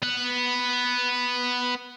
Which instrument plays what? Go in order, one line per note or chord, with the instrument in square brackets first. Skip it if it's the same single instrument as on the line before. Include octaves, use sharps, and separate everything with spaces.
[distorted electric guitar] B3 F#5